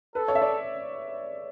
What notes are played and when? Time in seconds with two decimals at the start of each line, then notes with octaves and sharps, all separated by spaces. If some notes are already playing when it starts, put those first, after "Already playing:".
0.15 A4 B4
0.28 C#5
0.35 E5
0.42 D5